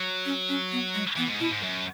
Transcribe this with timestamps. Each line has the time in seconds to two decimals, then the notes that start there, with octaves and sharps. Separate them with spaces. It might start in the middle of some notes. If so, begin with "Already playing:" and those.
Already playing: F#3
0.25 C#4
0.49 C#4
0.72 B3
0.94 G#3
1.16 E3 B3
1.28 G#2
1.40 B2 E4
1.51 G#2
1.63 F#2